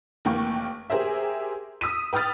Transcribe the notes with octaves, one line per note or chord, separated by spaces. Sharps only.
F1 E3 A#3 G5 C#6
G4 G#4 A#4 C5 E5
D#6 E6 B6 D#7
B4 G5 D#6 F6 A6